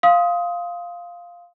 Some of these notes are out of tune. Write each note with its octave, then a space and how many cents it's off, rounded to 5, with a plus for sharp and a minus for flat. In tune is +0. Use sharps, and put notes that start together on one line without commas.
F5 +0 C6 +0 D#6 +20